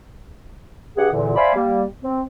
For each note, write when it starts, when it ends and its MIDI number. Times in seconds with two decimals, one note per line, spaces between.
0.97 1.07 43
0.97 1.07 67
0.97 1.07 68
0.97 1.07 78
1.11 1.35 40
1.11 1.35 46
1.11 1.35 50
1.11 1.35 52
1.36 1.52 72
1.36 1.52 74
1.36 1.52 76
1.36 1.52 77
1.36 1.52 80
1.36 1.52 83
1.54 1.84 55
1.54 1.84 58
2.03 2.21 60